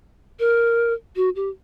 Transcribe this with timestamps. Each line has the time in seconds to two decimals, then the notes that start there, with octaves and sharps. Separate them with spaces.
0.39 A#4
1.16 F#4
1.36 G4